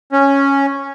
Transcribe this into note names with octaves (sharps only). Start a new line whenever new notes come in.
C#4